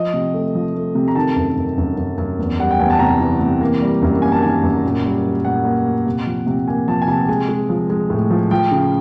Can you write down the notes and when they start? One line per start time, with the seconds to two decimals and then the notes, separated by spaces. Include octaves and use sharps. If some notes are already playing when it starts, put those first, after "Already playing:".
Already playing: F3 D#5
0.14 C3
0.34 A3
0.55 F3
0.75 A3
0.95 C3
1.08 A#5
1.15 D#3 A5
1.36 F#2
1.57 F#2
1.78 F#2
1.97 F#2
2.18 F#2
2.39 E2
2.59 G3 F#5
2.71 G5
2.79 E2 G#5
2.90 A5
2.99 C3 A#5
3.20 E3
3.41 C3
3.61 A#3
3.81 G3
4.02 F#2
4.22 A#3 G#5
4.32 A5
4.42 D#3 G#5
4.63 F#2
4.83 A#2
5.04 G3
5.24 A#2
5.45 A#2 F#5
5.65 A#3
5.85 A#2
6.06 C3
6.26 F3
6.47 C3
6.67 A#3 G#5
6.88 F3 A5
7.02 G#5
7.08 C3 A5
7.29 G#3 G#5
7.49 G#3
7.69 F3
7.90 G#3
8.10 A2
8.30 F3
8.51 F3 G5
8.72 C#3